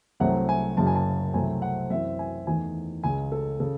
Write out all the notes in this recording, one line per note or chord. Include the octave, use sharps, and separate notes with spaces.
C2 C3 F#3 A3 C4 F#5
G#5
F#1 F#2 C#3 F#3 A5
G#5
A5
C2 C3 F#3 A3 C4 G#5
F#5
F#2 E3 C4 E5
G#5
E2 D#3 A3 G#5
C#2 C#3 G#3 G#5
A4
C#3 A4